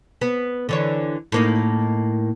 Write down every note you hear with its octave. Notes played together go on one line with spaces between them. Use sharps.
B3
D3 E3 C#5
A2 A#3 D#4